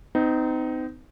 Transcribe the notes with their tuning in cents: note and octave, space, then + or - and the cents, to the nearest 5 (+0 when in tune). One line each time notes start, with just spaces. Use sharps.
C4 -40 D#4 +0